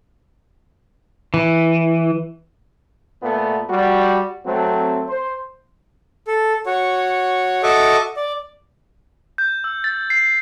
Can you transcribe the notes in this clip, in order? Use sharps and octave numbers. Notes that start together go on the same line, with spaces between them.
E3
A#2 A3 B3
G3 F#4
F#3 A3 C4
C5
A4
F#4 C#5
F#4 A4 D#5 E5 C#6 D6
D5
G6
E6
A6
C7